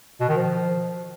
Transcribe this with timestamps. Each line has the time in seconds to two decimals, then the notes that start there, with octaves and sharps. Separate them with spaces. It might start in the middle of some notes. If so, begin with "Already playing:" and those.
0.20 B2
0.28 D#3
0.37 F3